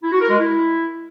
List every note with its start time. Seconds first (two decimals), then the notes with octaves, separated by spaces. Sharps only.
0.03 E4
0.12 F#4
0.21 A#4
0.30 G#3
0.39 E4